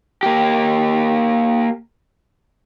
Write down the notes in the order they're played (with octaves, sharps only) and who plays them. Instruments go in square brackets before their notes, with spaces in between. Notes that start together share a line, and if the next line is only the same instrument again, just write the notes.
[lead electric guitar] A#3 G4